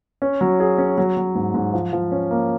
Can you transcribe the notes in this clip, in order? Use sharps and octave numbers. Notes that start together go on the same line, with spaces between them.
C#4
F#3
G#4
C#4
F#3
F#3
G#2
G#2
F3
F3
C#4
A#3